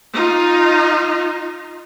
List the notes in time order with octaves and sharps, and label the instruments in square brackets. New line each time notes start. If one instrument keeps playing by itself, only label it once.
[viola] D#4 F4